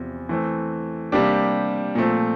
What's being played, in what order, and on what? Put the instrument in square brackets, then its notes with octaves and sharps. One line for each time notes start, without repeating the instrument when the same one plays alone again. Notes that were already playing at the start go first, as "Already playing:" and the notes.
Already playing: [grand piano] E2 C3 F3
E3 A3 C4
C3 G3 A#3 D4 G4
A#2 F3 A3 C4